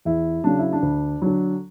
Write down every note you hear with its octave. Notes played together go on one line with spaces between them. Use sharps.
E2 E4
C#3 F#3 D4
E4
D4
D2
D3 F#3